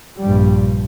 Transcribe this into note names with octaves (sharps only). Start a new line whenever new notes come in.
A#1 G2 G3